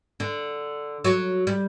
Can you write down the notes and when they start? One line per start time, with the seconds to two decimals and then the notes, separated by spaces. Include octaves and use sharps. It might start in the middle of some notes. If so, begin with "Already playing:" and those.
0.20 D3
1.04 F#3
1.47 G3